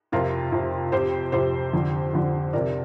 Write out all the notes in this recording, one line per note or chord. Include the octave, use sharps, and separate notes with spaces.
F2 C3 F4 A#4
F2 C3
F2 C3 G4 C5
F2 C3 G4 C5
F2 D3
F2 D3
F2 C3 A#4 D5